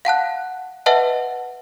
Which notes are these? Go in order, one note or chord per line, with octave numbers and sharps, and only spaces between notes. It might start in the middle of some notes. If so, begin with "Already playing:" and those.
F5 F#5 A5 F#6
B4 D#5 E5 F#5 A5